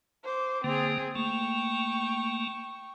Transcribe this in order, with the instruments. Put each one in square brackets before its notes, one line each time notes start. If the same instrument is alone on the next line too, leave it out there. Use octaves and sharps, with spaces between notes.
[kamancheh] C5 D6
[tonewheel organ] D3 A#3 [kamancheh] C4 G#4
[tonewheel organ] A3 A#3 [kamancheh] G5 C#6